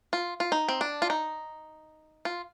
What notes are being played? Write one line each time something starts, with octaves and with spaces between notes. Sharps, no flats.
F4
F4
D#4
C4
D4
F4
D#4
F4